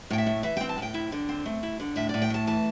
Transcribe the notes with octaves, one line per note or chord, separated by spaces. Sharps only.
A2 G5
E5
A3
E3 E5
C4 G5
A5
A2 G5
E4
D3
C4
A3
E4
D3
A2 E5
A2 D5
G5
A3 A5
E3 A5